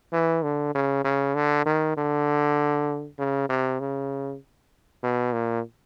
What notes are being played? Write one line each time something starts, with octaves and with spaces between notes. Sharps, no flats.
E3
D3
C#3
C#3
D3
D#3
D3
C#3
C3
C#3
B2
A#2